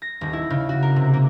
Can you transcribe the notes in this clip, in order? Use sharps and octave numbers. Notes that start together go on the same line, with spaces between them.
A#6
D#1
E4
C#3
F#4
A#4
C3
A#3